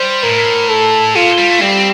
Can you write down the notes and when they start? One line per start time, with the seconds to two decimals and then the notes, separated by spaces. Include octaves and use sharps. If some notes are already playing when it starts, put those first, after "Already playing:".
Already playing: G3 C5
0.23 A2 A#4
0.69 A4
1.15 A#2 F4
1.38 G3
1.50 A3
1.61 G3 C4